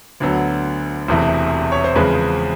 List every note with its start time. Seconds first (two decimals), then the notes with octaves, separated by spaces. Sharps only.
0.20 D2 D3 F#3 B3
1.08 E1 E2 C3 E3 A3
1.72 C#5
1.84 C5
1.95 E2 C#3 F3 G#3 C4 B4